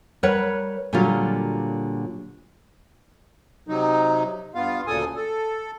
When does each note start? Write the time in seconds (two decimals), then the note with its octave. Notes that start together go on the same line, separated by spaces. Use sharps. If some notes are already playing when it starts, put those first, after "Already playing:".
0.23 G3 A#4 B4 C#5 F#5
0.93 A#2 D3 F#3 G3 F4 A#4
3.67 C3 F#3 D#4
4.55 G2 B3 F4 F5
4.87 D2 A#2 C#3 A4 G#5 D#6
5.16 A4